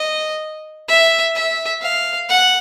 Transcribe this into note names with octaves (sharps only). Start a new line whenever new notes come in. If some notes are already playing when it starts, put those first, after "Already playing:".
Already playing: D#5
E5
E5
F5
F#5